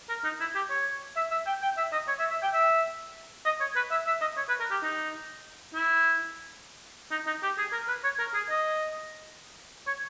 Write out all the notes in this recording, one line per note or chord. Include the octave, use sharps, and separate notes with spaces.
A#4
D#4
E4
G4
C#5
E5
E5
G5
G5
E5
D#5
C#5
E5
E5
G5
E5
D#5
C#5
B4
E5
E5
D#5
C#5
B4
A#4
G4
D#4
E4
D#4
D#4
G4
G#4
A#4
B4
C#5
A#4
G#4
D#5
C#5